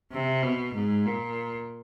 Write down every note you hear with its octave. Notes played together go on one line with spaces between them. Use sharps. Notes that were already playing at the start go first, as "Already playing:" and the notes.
C3
B2
G#2
A#2